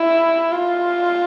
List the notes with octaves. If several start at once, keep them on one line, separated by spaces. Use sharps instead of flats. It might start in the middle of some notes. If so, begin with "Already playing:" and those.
Already playing: E4
F4